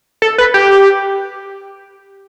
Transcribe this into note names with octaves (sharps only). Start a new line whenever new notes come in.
A4
B4
G4